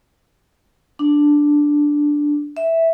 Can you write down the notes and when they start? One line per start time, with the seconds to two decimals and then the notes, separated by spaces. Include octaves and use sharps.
0.99 D4
2.57 E5